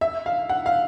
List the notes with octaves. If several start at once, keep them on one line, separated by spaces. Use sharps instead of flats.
E5
F5
F#5
F5